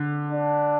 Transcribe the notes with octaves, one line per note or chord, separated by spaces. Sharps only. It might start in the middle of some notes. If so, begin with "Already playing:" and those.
Already playing: D3
D4